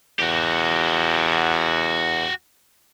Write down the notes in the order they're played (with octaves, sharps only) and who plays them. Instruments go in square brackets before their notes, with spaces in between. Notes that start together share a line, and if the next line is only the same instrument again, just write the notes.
[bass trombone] E2 [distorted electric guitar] F#4 G4